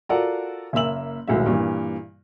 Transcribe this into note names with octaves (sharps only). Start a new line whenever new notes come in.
F4 F#4 A4 A#4 D5 F#5
F#1 A#3 E5 E6 F#7
D#1 B1 A2 G#3 F#4 E5
G2 A#2 E3